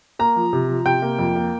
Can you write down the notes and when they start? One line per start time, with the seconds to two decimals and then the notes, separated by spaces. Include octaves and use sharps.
0.19 A#3 A#5
0.36 F3
0.53 C3
0.69 F3
0.86 C3 G5
1.02 A#3
1.19 F2
1.35 A#3